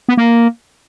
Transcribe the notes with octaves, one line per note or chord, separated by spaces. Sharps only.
B3
A#3